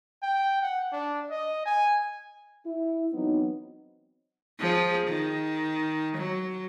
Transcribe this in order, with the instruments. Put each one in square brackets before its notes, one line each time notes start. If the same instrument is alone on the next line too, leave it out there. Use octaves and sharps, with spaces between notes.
[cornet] G5
F#5
D4
D#5
G#5
[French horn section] E4
E3 F#3 B3 C4 D#4
[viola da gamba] F3 G#4
D#3
F#3